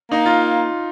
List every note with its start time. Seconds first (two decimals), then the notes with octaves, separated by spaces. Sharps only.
0.11 A#3 D#4
0.26 F4